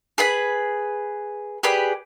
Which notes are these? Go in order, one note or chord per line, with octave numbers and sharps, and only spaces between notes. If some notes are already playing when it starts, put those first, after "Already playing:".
G#4 B4 B5
G4 G#4 B4 D5